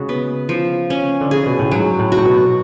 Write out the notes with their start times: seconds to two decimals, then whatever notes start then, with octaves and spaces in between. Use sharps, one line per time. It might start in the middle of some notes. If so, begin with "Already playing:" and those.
Already playing: C#3 G#3 F#4
0.09 B3
0.49 F3
0.90 C#4
1.21 D3
1.31 C#3 G#4
1.46 B2
1.59 A2
1.71 G#2 F#3
1.99 A2
2.12 F#4
2.17 A2
2.25 B2